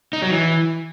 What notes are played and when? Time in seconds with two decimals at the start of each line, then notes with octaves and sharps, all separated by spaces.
0.13 D#4
0.22 F#3
0.31 E3